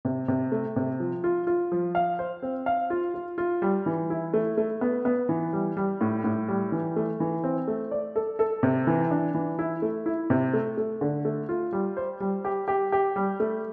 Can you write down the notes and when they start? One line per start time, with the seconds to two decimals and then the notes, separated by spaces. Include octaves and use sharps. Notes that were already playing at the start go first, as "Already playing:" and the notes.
0.05 C3
0.28 C3
0.52 A3
0.76 C3
1.00 F3
1.24 F4
1.47 F4
1.72 F3
1.95 F5
2.19 C5
2.42 C4
2.66 F5
2.90 F4
3.14 F4
3.38 F4
3.62 G3
3.86 E3
4.10 E4
4.33 A3
4.57 A3
4.81 B3
5.05 B3
5.29 E3
5.53 G3
5.77 G3
6.01 A2
6.24 A2
6.48 G3
6.72 E3
6.96 A3
7.20 E3
7.44 C4
7.68 A3
7.91 D5
8.16 A4
8.39 A4
8.63 C3
8.87 E3
9.11 D4
9.35 E3
9.59 E4
9.82 A3
10.06 E4
10.30 C3
10.53 A3
10.77 A3
11.01 D3
11.25 A3
11.49 F4
11.73 G3
11.97 C5
12.20 G3
12.45 G4
12.68 G4
12.92 G4
13.16 G3
13.40 A3